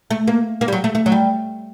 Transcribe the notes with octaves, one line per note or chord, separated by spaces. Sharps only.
A3
A#3
A#3
G3
F#3
A3
A3
F#3
G3